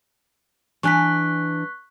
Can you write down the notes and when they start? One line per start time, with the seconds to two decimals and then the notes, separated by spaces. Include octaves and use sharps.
0.83 E3 D4 G#5 C#6 F#6 B6